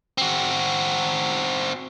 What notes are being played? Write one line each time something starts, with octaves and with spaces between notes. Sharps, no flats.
C4 F#4